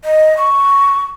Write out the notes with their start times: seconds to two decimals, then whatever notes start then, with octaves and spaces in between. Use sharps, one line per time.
0.04 D#5
0.37 C#6